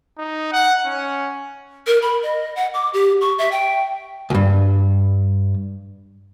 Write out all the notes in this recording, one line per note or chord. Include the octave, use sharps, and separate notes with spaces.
D#4
F#5
C#4
A#4
B5
D#5
F#5
D6
G4
C#6
E5
G5
C#2 G2